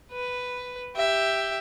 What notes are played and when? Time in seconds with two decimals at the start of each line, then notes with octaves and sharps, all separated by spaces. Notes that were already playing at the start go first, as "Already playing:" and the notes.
0.12 B4
0.96 G4 E5